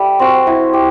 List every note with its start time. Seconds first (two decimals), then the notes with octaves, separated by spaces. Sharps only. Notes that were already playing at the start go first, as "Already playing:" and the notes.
Already playing: G3 A4 E5
0.19 C4 F#4
0.47 E4
0.73 G4